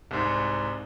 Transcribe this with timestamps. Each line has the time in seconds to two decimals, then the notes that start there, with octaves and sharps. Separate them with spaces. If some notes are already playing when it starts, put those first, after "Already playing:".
0.11 C2 G#2